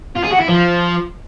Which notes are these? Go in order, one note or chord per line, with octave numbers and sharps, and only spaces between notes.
F4
G#4
F#4
E4
F3